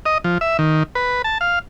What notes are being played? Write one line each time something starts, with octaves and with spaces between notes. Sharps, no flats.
D#5
F3
E5
D#3
B4
A5
F5